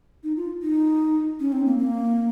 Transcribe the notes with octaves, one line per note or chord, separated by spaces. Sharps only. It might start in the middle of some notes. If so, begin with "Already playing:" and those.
D#4
F4
D#4
C#4
C4
A#3
A#3